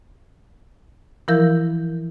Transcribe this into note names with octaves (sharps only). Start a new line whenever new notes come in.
E3 F3 E4 A#4 G6